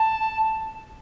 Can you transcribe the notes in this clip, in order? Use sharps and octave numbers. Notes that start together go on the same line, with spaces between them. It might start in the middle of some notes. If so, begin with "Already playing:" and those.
Already playing: A5